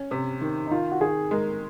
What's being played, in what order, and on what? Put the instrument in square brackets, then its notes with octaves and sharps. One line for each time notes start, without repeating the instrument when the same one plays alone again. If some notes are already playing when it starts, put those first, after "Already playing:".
Already playing: [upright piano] C#4
C3
D#3
[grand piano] D#4
[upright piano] D#3 [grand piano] F4
[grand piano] F#4
[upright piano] D#3 [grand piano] G#4
[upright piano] G#3 [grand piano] A#4